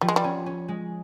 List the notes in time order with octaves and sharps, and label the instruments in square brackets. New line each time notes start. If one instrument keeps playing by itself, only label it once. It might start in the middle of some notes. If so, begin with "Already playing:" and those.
[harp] F3 [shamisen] G3
[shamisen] G#3
G3
[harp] C#4
C#4
G#3